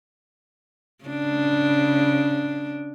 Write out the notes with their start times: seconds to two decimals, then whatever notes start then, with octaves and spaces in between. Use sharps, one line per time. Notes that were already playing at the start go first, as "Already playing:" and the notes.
1.05 C#3 D4